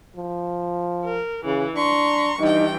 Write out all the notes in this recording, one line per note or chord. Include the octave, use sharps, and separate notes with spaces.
F3
A#4
C#3 E3
D4 A#5 C6 C#6
G2 E3 D#4 G5